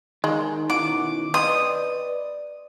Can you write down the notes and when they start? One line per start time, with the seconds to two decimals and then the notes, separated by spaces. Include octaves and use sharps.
0.24 D#3 G#3
0.70 B2 C#4 E4 F#4 D6
1.34 C4 B4 D5 D#5 D#6